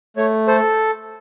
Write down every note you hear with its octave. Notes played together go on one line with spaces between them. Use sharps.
A3 C#5
A4 C5